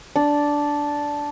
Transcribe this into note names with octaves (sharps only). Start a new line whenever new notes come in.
D4